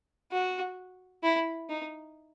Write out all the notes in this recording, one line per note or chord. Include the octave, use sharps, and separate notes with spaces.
F#4
E4
D#4